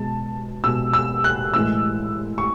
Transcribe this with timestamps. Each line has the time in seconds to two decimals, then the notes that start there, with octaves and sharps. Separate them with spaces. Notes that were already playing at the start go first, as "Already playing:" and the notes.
Already playing: B2 G#3 A5
0.64 B2 G#3 E6
0.93 E6
1.24 F#6
1.54 A2 E3 G#3 E6
2.38 C#6